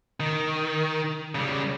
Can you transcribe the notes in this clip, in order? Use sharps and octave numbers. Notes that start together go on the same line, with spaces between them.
D#3
C#3 G3